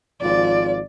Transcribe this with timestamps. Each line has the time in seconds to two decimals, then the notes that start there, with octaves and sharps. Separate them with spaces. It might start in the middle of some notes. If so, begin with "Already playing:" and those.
0.21 G#1 F3 F4 D5